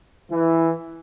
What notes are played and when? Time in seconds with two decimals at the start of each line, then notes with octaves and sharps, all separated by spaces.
0.31 E3